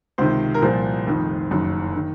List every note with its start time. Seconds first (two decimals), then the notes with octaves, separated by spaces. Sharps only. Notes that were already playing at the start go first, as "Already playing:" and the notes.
0.18 C#2 C3 D#3 C5
0.54 A#4
0.62 C2 A#2 F3 C5
1.07 F1 F2 D#3
1.51 F#1 F#2 D#3
1.96 D#3